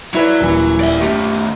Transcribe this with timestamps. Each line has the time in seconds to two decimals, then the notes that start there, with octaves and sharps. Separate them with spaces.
0.14 F#3 E4 B4 D5
0.41 D#1 E3
0.81 D5 E5
1.01 D#3 A3 G4